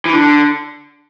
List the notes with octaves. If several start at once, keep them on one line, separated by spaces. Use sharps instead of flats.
E3
D3